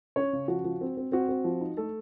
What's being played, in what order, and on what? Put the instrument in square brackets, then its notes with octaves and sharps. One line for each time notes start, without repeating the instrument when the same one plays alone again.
[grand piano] C#4 C#5
C#3
F3 F#4
F3
C4
C4
C4 F#4
C4
F3
D#4
A3 A4